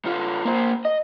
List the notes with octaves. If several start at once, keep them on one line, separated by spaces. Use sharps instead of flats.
D3 F4
A#3 C5
D#5